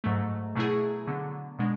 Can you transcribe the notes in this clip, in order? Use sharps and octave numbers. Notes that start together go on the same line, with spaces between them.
G#2 F#3 A3
B2 F#3 A3 E4 G#4
D3 F#3 B3
B2 G#3 D4